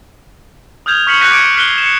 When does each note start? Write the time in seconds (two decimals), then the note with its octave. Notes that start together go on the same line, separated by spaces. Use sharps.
0.86 D#6 F6 G6 G#6 F7
1.07 C#6 F6 B6 C#7 F#7
1.20 F#6 G6 A#6 B6 C#7 D#7
1.32 D6 G#6 C#7 D7
1.55 F6 F#6 B6 C7 G7
1.78 C#7 E7